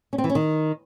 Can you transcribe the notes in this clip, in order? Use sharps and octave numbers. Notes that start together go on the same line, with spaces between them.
C#4
C4
E3
C#4
D#3